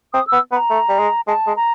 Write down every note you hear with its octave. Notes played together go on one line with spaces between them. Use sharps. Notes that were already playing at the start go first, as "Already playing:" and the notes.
C4 D#6
E6
B3
B3 B5
A#5
A3
G3
G#3
G#3 A5
G#3
A#5